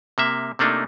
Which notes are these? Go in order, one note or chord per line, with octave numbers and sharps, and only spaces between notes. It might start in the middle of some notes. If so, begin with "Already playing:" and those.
C3 A#3 E5
C3 A3 A#3 D4 D#4